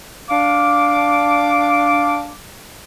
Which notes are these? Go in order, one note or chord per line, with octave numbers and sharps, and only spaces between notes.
D4 F5 D6